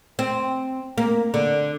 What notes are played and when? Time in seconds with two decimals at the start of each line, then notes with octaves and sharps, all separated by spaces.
0.19 C4
0.98 A#3
1.34 D3